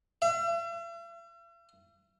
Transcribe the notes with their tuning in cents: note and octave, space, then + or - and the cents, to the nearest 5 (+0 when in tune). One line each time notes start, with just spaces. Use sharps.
E5 +45